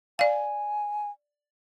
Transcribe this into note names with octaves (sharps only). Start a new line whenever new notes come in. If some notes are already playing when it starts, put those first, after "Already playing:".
D5 F5 G#5